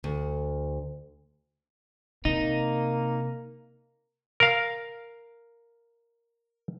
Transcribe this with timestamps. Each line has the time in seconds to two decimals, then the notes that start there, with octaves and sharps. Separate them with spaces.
0.04 D2
2.25 C3 A#3 D#4
4.40 A#4 F5